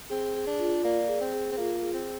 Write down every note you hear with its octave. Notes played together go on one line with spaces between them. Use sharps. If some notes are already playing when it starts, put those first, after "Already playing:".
C4 G#4
G#4
D4
F4
A#3 D5
G#4
C4
G#4
C4
A#3 F4
G#4
C4